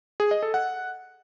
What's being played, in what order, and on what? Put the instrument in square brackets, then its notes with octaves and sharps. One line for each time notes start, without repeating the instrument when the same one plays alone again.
[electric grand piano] G#4
D#5
A4
F#5